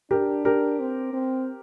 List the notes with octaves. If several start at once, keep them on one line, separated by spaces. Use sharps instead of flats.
D4 G4 A#4
G4 A#4
C4
C4